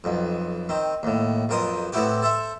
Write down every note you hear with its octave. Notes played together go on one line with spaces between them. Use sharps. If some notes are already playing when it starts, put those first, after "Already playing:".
B1 F2
D#3 C4
D#2 A2
B1 F2 A#4 C5 D#6
A2 B3 C4 E4 F#4 G4
A4 C5 E5